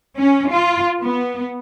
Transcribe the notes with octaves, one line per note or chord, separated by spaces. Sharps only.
C#4
F4
B3